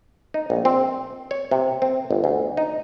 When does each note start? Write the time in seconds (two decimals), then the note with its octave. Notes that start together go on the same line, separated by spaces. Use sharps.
0.34 D#4
0.50 A#1
0.65 C4
1.31 C#5
1.51 C3
1.82 C4
2.11 G1
2.24 D2
2.57 D#4